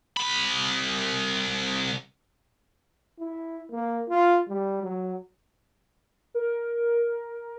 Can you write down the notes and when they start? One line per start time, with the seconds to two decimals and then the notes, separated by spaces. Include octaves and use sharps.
0.17 C2 B5
3.19 E4
3.71 A#3
4.09 F4
4.48 G3
4.83 F#3
6.34 A#4